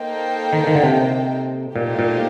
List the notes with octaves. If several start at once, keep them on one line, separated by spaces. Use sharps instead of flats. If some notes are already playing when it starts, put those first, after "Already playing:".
Already playing: A#3 D#4 A4 C5 G5
D#3
D#3
D3
C3
A#2 A3 D#4 G4 C5
A#2